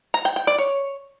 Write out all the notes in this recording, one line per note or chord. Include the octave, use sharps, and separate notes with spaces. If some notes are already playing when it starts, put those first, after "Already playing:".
A#5
G5
G5
D5
C#5